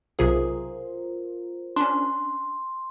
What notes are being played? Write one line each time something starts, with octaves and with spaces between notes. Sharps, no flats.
B1 C3 F4 G#4 A#4 C5
C#4 D4 C6